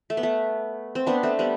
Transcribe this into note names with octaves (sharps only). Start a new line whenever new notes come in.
A3
B3
A3
C4
B3 D4
A3 C4
G3 B3